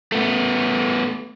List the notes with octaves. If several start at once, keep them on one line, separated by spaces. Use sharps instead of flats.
A3 B3